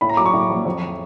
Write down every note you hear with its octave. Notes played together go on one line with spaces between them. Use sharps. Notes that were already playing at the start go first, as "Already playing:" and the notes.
A2 B5
A#5
F#3 D6
C#6
A2
A#1
F2